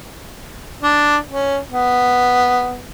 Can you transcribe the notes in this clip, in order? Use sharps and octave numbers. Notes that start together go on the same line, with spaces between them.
D4
C#4
B3